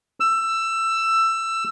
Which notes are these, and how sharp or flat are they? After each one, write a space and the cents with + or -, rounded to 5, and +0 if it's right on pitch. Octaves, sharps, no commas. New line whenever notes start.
E6 +15